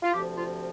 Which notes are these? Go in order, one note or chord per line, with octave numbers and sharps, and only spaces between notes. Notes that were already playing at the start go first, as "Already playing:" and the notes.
F4
D2 C3 F3 G4
F4